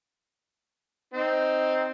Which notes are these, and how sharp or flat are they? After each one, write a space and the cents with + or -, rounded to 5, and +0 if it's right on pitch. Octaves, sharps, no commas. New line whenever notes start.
C4 +0 D#4 +0